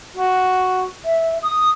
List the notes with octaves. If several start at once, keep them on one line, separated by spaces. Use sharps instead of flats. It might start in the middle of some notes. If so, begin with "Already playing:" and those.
F#4
E5
D#6